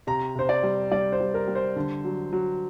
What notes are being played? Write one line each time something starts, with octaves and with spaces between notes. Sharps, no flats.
C3 A#5
C3 C5
D5
G3
G3 D5
C5
G3
A#4
G3
C5
D3
F#3
F#3